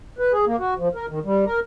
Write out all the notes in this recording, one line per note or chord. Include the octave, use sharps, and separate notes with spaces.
B4
G#4
A#3
F#4
F3
A#4
D#3
G3
A#4